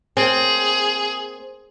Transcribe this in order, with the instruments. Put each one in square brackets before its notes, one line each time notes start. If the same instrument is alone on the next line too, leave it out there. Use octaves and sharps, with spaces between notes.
[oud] A#3 C4 [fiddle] G#4